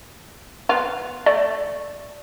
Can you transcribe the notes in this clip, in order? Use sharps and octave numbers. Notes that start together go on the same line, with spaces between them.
B3 F4
A3 D5